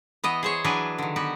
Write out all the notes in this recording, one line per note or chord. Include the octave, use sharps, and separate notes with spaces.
E3 B3 D#5
G#4 C5 C#5
E3 F#3 D4 B4 D#5 G#5
D3 D#3
B3 F#4 G4